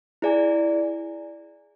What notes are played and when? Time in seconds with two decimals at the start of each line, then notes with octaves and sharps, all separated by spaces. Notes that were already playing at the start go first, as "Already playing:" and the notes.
0.22 E4 G#4 D5 G#5